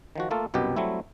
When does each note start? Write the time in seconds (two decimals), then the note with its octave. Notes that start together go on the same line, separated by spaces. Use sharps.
0.16 D#3 F3 F#4
0.31 A3 A#3 F4 A4
0.54 C2 F#2 B2 B3 G4
0.76 F#3 G3 A3 C4 E4